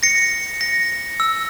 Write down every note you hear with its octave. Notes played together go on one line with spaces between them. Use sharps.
A#6 C#7
A#6 C#7
E6